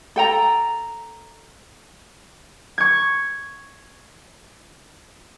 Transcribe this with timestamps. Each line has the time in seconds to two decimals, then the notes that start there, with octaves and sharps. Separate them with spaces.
0.16 A4 G5 A#5
2.78 C#6 G#6